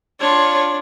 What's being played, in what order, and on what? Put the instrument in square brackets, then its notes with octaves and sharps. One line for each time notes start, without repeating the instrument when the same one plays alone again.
[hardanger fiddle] D4 [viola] F4 C#5